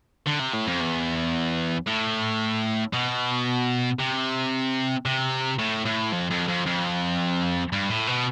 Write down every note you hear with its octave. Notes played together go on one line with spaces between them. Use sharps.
D3
C3
A2
F2
E2
A2
B2
C3
C3
A2
A2
F2
F2
F2
F2
G2
A2
B2